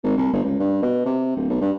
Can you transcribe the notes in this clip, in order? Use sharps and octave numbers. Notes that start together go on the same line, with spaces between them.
G#1
C2
G1
C#2
G2
B2
C3
D1
B1
G2